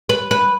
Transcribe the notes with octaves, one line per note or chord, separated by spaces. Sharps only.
B4
B4